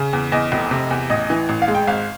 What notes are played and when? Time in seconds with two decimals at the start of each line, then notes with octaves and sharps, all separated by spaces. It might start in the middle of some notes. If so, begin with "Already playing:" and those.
Already playing: C#3
0.13 E2
0.32 E2 D#5
0.52 F1
0.71 C3
0.91 E2
1.10 A1 D#5
1.30 E3
1.49 A1
1.62 F5
1.68 G#3
1.75 G5
1.87 G#1 F5